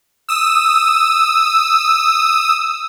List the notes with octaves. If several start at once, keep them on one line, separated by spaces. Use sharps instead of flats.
D#6 E6